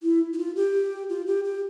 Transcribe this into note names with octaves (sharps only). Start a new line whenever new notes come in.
E4
E4
F4
G4
F4
G4
G4